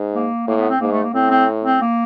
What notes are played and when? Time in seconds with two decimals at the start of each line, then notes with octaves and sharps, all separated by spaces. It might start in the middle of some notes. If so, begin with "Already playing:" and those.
Already playing: G#2
0.14 A#3
0.47 A2 A#3
0.58 B3
0.70 C4
0.81 G#2 A#3
0.92 A3
1.04 A#3
1.14 A2 C4
1.31 C4
1.65 C4
1.82 A#3